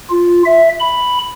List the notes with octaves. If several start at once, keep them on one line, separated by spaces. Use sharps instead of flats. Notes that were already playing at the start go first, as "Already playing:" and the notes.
F4
E5
B5